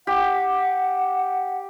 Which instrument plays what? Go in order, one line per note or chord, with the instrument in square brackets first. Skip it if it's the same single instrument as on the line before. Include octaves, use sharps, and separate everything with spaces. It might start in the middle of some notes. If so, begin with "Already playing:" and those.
[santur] G4 [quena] F#5